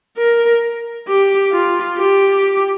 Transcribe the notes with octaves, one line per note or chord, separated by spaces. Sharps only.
A#4
G4
F4
G4